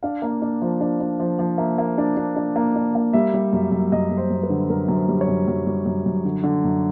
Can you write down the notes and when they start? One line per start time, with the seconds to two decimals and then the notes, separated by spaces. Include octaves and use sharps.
0.03 D4 F5
0.22 A#3
0.42 D4
0.62 F3
0.81 D4
1.00 D4
1.20 F3
1.39 F3
1.58 A#3 E5
1.78 A#3
1.98 D4
2.17 D4
2.36 D4
2.56 A#3
2.76 D4
2.95 A#3
3.13 G3 E5
3.34 G3
3.53 F#2
3.72 F#2
3.92 F#2 D#5
4.11 F#2
4.18 C5
4.30 F#2
4.43 B4
4.50 D3
4.69 F#2 A#4
4.88 F#2
4.96 C5
5.08 G3
5.21 C#5
5.28 F#2
5.47 F#2
5.66 G3
5.86 F#2
6.06 F#2
6.25 D3
6.44 D3
6.64 F#2